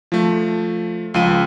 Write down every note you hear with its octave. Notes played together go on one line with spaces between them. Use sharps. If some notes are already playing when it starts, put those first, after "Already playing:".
F3 A3
C#2 F3 D#7